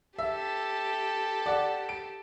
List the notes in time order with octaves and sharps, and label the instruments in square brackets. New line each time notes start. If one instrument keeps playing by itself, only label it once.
[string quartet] G4 A4 [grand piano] E5
[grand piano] D5 F#5
D7